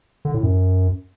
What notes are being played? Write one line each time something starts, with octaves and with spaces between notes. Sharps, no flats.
D3
A2
F#2